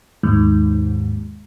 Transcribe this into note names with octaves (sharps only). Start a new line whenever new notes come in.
D#2 G#2